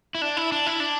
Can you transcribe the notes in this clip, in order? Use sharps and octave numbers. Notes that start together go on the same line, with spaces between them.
E4
D4
E4
D4
E4
D4